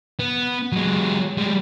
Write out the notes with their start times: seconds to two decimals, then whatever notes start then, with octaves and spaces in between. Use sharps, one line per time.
0.19 B3
0.72 F#3 G#3
1.37 G3 G#3